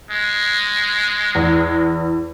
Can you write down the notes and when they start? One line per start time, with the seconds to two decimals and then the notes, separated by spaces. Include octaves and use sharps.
0.10 G#3
1.35 E2